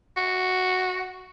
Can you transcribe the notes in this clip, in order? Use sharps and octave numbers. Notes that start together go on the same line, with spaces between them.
F#4